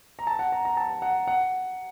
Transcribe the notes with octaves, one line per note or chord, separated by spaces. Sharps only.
A#5
A5
F#5
A#5
A#5
A5
F#5
F#5